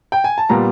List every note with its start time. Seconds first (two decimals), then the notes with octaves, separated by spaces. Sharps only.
0.12 G5
0.24 G#5
0.38 A5
0.49 A#2 G3 B3 A#5